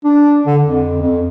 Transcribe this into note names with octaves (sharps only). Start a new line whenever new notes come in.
D4
D3
F2
F2